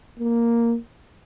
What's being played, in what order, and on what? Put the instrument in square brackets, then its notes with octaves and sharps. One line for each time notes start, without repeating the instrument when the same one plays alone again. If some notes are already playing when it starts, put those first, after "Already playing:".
[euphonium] A#3